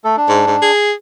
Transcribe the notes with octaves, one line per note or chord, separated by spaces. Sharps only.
A3 A4
D4
G#2
G#2
G#4